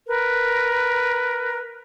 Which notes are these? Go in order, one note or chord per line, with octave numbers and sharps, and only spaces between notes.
A#4 B4